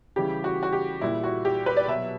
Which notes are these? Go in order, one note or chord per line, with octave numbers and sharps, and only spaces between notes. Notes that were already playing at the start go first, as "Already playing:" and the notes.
C#3 E3 G3 G4
F#4
F#4
G4
A#2 G3 E4
F#4
G4
B4
D5
B2 F#3 E5